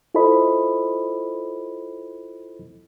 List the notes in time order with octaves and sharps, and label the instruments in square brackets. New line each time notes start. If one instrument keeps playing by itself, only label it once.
[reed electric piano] E4 F4 A4 C5 D#5 B5